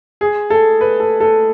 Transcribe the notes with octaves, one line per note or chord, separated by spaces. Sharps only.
G#4
A4
B4
A4
A4